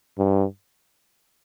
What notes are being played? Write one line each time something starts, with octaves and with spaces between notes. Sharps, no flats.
G2